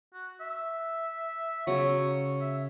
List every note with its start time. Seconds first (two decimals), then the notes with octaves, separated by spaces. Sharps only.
0.14 F#4
0.41 E5
1.67 C#3 F#3 C#6
2.41 E5